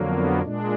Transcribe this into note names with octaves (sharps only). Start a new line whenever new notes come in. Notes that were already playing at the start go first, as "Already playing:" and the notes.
Already playing: F2 D3 F#3 A#3
B3
A#2 G#3 D4